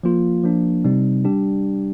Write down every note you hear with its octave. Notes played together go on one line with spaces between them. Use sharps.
F3 A#3 F4
F3 A#3 D4
C3 G3 C4 D#4
G3 D4 G4